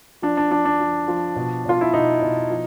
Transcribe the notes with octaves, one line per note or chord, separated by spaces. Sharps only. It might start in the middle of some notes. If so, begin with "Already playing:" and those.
F3 D4
D4
F3 D4
D4
F3
F3
B2
B2 F4
E4
B2 D#4
B2
F3